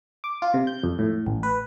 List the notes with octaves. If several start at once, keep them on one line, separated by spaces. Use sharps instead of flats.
D6
F4
C3
G6
F2
A2
A1
B4